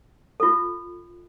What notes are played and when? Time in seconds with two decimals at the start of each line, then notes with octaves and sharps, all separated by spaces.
0.40 F4 A4